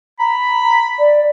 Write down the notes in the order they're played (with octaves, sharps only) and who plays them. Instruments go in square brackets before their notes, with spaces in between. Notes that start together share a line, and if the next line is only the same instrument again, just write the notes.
[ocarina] A#5 [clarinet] B5
[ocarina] D5